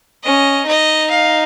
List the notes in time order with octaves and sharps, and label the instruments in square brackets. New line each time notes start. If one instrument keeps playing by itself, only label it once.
[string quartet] C#4 [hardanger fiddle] D#5
[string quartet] D#4 [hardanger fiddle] D#5
[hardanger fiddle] F5